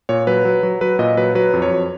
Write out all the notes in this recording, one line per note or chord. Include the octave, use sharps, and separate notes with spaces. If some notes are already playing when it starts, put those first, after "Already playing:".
A#2 C#5
F#3 B4
F#3
F#3
F#3 B4
A#2 D#5
F#3 B4
F#3 B4
F2
C#5
F2